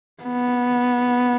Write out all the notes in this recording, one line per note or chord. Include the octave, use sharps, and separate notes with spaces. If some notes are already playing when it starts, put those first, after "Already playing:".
B3